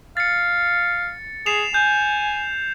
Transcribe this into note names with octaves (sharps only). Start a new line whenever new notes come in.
F5 A6 C#7
G#4 C7 E7 F7
G#5 G6